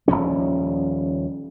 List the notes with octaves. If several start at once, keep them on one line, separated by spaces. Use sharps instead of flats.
D#1 D#2 F3 C#4